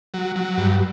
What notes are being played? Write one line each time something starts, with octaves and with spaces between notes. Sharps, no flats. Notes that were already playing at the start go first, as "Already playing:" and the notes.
F#3
F#3
G2